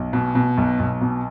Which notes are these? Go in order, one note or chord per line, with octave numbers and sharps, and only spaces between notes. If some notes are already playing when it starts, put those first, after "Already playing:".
Already playing: B1
B2
B2
B1
B1
B2